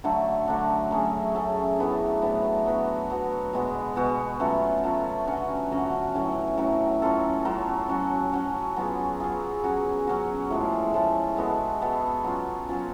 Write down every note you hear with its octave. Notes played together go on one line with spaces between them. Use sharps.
D3 F#3 A3 D4
D3 F#3 A3 D4
F#3 A3 C#4 G#4
F#3 A3 C#4 G#4
A2 F#3 B3 D4
A2 F#3 B3 D4
F#3 B3 F#4
F#3 B3 F#4
B2 G#3 B3 F#4
B2 G#3 B3 F#4
F#3 A3 C#4 F4
F#3 A3 C#4 F4
D3 F#3 C#4 F#4
D3 F#3 C#4 F#4
A2 F#3 C#4
A2 F#3 C#4
F#3 C#4 F4 A4
F#3 C#4 F4 A4
F#3 C#4 F#4
F#3 C#4 F#4
F#3 B3 F4 G#4
F#3 B3 F4 G#4
F#3 C#4 F#4
F#3 C#4 F#4
A2 F3 G#3
A2 F3 G#3
G#3 B3 F#4 A4
G#3 B3 F#4 A4
F#3 C#4 F4
F#3 C#4 F4